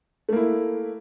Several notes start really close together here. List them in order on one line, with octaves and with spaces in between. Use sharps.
A3 A#3 E4